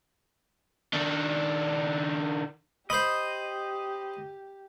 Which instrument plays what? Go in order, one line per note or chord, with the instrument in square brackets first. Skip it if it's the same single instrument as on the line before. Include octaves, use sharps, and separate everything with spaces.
[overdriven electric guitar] D#3 D4
[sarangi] G4 [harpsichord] C5 B5 [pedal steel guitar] D#5